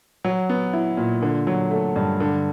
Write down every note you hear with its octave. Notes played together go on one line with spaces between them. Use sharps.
F#3
B3
E4
A#2
D3
F#3
A3
G2
D3